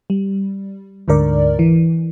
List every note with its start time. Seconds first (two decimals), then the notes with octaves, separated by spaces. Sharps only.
0.10 G3
1.08 D2 G#2 D3 A#4 D5
1.59 E3